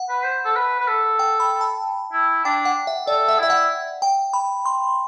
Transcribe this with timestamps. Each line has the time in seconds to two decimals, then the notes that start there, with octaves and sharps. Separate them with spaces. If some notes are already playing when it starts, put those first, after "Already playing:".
Already playing: F#5
0.09 B4
0.24 C5
0.45 A4
0.56 B4
0.79 B4
0.87 A4
1.19 G5
1.40 B5
1.61 A5
2.13 E4
2.45 D4 G5
2.65 F#5
2.87 E5
3.07 A4 D5
3.28 E5
3.39 E4 E5
3.50 F#5
4.02 G5
4.33 B5
4.66 C6